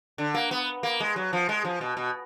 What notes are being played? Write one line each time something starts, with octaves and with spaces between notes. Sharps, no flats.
D3
A#3
B3
A#3
G#3
F#3
F3
G#3
F3
B2
B2